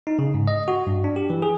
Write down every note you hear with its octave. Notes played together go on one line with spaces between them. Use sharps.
D#4
C#3
G#2
D#5
F#4
G2
D4
G4
E3
G#4